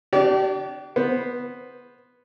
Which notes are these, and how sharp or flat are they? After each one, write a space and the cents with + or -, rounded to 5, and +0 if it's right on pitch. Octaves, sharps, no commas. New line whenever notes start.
D4 +10 G4 -35 D5 -45
B3 -5 C5 +0